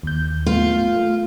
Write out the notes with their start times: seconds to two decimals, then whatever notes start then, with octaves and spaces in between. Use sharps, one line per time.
0.03 D#2 G6
0.46 A3 B3 F4
0.96 A3